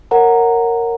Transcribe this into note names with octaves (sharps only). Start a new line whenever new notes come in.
A#4 C#5 F#5 A#5